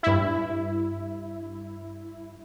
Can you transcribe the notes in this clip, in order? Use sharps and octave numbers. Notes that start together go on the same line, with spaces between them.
G2 E4